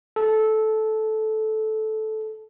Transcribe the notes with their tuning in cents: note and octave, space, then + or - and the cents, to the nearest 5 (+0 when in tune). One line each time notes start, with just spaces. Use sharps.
A4 -15